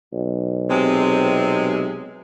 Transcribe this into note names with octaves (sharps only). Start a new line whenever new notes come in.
B1
C3 G#3 C4